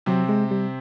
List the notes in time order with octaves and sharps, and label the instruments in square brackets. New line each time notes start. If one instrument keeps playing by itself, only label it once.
[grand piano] C3 C4 [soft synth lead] F#3
[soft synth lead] G#3
G3